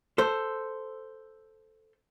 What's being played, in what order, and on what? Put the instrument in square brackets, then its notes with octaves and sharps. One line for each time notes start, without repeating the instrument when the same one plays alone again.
[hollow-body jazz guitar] A4 C5